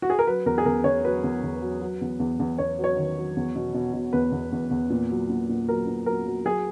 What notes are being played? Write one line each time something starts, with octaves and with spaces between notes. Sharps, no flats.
F#4
G#4
A#4
F#3 B4
E2 A#4
G#4
E2 A#4
E2 C#5
F#3 B4
E2
E2
F#3
F#3
E2
E2
E2
E2 C#5
F#3
C#5
D#3
F#3
E2
B2
B2
B2
E2 B4
E2
E2
E2
A#2
F#3
A#2
A#2
F#3 A#4
A#2
F#3 A#4
F#3
F#3 G#4